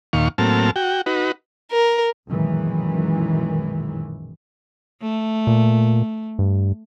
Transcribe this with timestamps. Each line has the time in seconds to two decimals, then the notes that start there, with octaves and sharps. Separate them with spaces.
0.13 D#2 A#2 D#3 F5 C#6
0.38 A2 F#3 A#3 C4 A5 F6
0.76 F#4 G5
1.06 D#4 F#4 B4
1.72 A#4
2.30 B1 F#2 A#2 D#3 E3 G#3
5.02 A3
5.47 A#2
6.39 G2